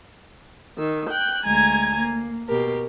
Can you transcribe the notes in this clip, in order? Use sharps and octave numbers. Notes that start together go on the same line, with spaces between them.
D#3 E6
G5 F#6
D2 G#3 G#5 A#5 G#6
A#3
B2 G4 A#4